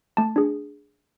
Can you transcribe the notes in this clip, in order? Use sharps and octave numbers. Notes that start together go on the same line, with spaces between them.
A3 A5
D4 G#4